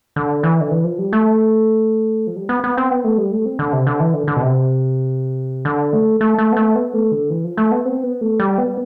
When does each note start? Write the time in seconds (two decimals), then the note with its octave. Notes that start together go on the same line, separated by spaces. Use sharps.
0.16 D3
0.43 E3
0.61 D3
0.71 E3
0.84 F3
0.99 G3
1.13 A3
2.27 F3
2.36 G3
2.49 B3
2.64 B3
2.77 C4
2.91 B3
3.04 A3
3.18 G3
3.31 A3
3.46 C4
3.59 D3
3.72 C3
3.87 D3
4.00 E3
4.14 D3
4.28 D3
4.36 B2
4.42 C3
5.65 D3
5.93 A3
6.21 A3
6.38 A3
6.52 B3
6.57 A3
6.75 B3
6.94 A3
7.12 D3
7.30 E3
7.44 F3
7.57 A3
7.72 B3
7.85 C4
8.03 B3
8.21 A3
8.40 G3
8.58 B3